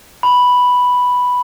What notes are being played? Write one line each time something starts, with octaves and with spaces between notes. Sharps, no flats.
B5